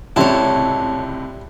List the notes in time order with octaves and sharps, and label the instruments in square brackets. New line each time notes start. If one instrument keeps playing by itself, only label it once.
[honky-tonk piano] C#2 A2 C3 [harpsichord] G3 C4 E4 [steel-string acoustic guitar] A4 C#5